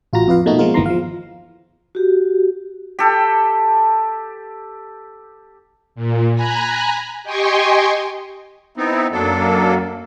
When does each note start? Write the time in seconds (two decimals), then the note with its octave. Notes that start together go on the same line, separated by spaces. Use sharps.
0.13 A1 F4 F#4 A#5 A#6
0.28 F2 F4 B4 F5
0.46 B2 A3 A#3 D#4 F#4
0.59 F3 G#3 A#3 F4 A#4
0.74 G1 D#2 E3 B3 A#5 C6
0.86 F3 F5
1.95 F#4 G4
2.99 G4 A4
5.95 A#2
6.35 G#5 A#5 B5 F#6
7.24 G4 D#5 G5 G#5 C6 C#6
8.77 B3 C4 D#4 E4
9.12 F#2 F#3 A#3 D4 A4